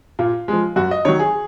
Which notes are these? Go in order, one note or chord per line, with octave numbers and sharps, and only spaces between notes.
A#2 F4
F3 G#3
F#2 F#4
D#5
D#3 F#3 C#5
G#4